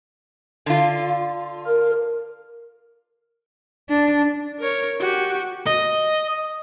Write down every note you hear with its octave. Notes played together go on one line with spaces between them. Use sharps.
D3 F4
A#4
D4
A#4 C#5
F#4 G4
D#5